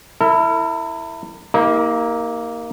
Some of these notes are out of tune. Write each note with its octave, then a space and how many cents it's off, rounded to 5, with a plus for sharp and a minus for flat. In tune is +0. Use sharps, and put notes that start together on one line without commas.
E4 +0 A#4 -45
A#3 +0 D#4 +40 G4 +25